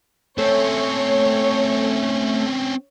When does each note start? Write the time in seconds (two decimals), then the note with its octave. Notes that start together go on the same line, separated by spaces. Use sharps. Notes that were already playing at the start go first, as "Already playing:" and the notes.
0.38 A3 C4 C#4 C#5